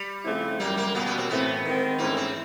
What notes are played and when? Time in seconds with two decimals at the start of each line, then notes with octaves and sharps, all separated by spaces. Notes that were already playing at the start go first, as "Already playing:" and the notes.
Already playing: G3
0.25 C#3 F3 A3 C4 E4
0.60 F#2 D3 G3 A#3
0.77 A#3
0.94 B2 G3 A#3 B3 C#4 F#4
1.06 B3
1.17 C4
1.30 A2 E3 A3 B3 C4
1.65 D#3 G#3 C4
1.98 G#2 E3 A3 A#3 C#4 E4
2.17 C4